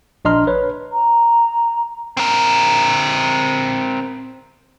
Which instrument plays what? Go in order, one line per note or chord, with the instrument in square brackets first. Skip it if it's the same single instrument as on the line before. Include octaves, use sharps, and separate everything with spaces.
[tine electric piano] A#1 D4 D#5 A#5 C6 F6
B4 C#5
[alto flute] A#5
[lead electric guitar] C4 A#4